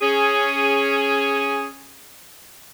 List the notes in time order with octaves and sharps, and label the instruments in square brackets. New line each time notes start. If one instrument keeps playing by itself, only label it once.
[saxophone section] C#4 G#4